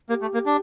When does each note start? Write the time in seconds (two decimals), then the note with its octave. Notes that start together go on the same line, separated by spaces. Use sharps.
0.09 A#3 G4
0.22 A3
0.34 A#3
0.46 D4